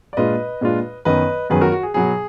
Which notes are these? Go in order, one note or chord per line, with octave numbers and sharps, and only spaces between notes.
D5
A#2 G#3 D4 F4 B4 D#5
A#2 G#3 D4 F4
F#2 D#3 F#3 B3 B4 D#5
F#2 D#3 F#3 B3 G#4 B4
F#4 A#4
F#4
G#4
B2 F#3 B3 G#4